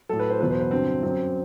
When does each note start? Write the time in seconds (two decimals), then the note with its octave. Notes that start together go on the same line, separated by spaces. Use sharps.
0.09 A2 F#3 A4
0.19 B4
0.30 C5
0.40 E2 B2 F#3 B4
0.50 C5
0.60 B4
0.71 G2 D3 F#3 C4
1.03 F#2 F#3 C4